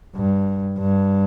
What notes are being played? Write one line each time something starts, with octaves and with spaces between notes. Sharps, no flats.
G2
G2